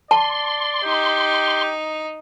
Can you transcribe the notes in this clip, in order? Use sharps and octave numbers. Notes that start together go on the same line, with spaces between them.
D5 A5 C6
D#4 G4